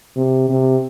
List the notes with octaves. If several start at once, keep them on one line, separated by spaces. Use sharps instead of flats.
C3
C3